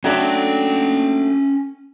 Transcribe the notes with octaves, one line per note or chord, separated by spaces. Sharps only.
F#3 A3 C#4 D4 G5